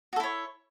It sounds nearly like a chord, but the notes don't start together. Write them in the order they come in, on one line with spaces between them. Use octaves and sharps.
F#4 A4 E4 C#5